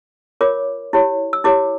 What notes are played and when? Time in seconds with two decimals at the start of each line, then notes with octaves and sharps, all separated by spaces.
0.41 F4 A#4 C#5 D6
0.93 E4 G4 C#5
1.33 E6
1.44 E4 G4 C#5 D6